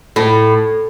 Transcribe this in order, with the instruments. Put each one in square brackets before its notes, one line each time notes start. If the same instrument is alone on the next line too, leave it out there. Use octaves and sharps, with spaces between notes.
[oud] A2